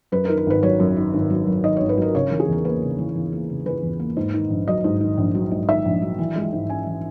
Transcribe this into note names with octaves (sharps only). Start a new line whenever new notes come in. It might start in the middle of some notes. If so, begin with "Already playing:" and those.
F#2 B4
A#4
D#3
A#4
G#1 B4
F#3 C#5
F#2
D#3
G#1
F#3
F#2
D#3 D#5
G#1 C#5
B4
F#3 A#4
C#3 C#5
E3 A#4
G#4
E2 A#4
A#3 B4
C#3
E3
E2
A#3
C#3
E3 B4
E2
A#3
G#2
D#3
A#1
F#3 D#5
G#2
D#3
A#1
F#3
G#2
D#3 E5
A#1
F#3
E3
G#3
G#2
C#4 G#5
E3